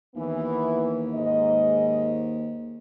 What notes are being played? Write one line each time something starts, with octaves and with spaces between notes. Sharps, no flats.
D#2 E3 B3
G#2 D#5